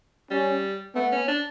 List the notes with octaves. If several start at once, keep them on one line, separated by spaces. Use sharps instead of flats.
G3 C#4
A3 B3
C#4
D4